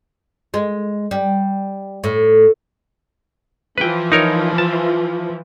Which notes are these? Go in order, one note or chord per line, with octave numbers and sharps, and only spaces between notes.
G#3
G3
A2
E3 F3 B4 G5
D#4 A#4 C#5
A5